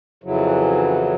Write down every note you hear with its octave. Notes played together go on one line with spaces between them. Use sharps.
F2 C#3 E3 F#3